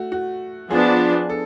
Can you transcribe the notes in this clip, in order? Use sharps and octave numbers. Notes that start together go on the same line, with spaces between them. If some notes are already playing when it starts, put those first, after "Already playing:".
Already playing: A3 F#4
F#4
F3 B3 D4 G#4
A4